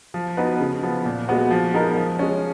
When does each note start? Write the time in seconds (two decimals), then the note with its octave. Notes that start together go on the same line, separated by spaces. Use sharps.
0.14 F3
0.37 B3 D#4 F#4 B4
0.60 C#3
0.83 F3 B3
1.05 A#2
1.28 G#3 B3 F#4
1.51 F3
1.74 G#3 B3 D#4 A#4
1.97 F3
2.19 G#3 C#4